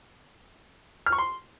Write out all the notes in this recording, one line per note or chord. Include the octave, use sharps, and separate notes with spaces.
F6
C#6
C6